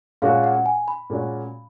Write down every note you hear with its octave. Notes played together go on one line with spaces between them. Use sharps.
A#2 G#3 C#4 F#4 F5
F#5
G#5
B5
A#2 G#3 C#4 F#4